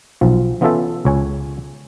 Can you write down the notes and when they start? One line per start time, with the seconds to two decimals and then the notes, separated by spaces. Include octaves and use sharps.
0.21 B1 F3
0.61 E3 B3 C#4 F4 A4 E5
1.05 C#2 C#5 G#5